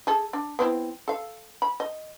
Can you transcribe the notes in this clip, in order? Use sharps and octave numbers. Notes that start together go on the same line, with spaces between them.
G#4 A4
D4
B3 C4 E4
A4 F5
B5
D#5